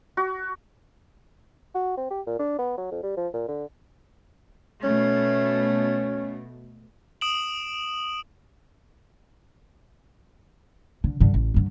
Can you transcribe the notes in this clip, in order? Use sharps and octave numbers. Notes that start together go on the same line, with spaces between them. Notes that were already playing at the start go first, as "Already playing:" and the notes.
F#4
F#4
C4
G4
A#2
D4
B3
F#3
F2
G3
F3
A#2
D3
B2 A3 C#4
D#6 D7 E7 F#7
D3
G2 D3
A1
G2 D3